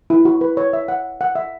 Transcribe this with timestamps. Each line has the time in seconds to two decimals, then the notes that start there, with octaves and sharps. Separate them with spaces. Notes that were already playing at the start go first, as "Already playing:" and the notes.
0.10 E4
0.25 F#4
0.41 B4
0.57 C#5
0.73 E5
0.88 F#5
1.21 F#5
1.35 E5